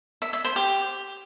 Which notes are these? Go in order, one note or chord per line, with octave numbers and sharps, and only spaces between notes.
E5
E5
C5
G4